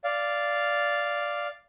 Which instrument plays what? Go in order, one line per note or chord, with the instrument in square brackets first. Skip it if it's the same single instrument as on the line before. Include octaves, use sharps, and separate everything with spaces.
[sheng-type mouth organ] D5 F5